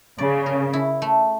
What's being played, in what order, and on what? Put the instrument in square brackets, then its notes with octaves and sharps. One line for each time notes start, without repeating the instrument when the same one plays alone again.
[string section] C#3 [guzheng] D5
[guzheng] A#4
E4
A3